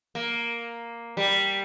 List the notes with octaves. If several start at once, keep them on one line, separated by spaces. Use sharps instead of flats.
A#3
G3